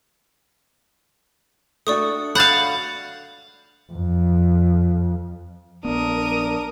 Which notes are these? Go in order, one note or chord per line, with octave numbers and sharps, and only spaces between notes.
A3 D4 F#4 D5 C#6 D#6
F5 F#5 B5 G6 A6
F2
A#1 B3 D4 A#4 D#6